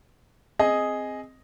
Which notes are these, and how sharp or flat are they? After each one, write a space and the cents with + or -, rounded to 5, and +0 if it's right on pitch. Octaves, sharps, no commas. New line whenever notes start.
C4 +0 G#4 +0 D#5 +0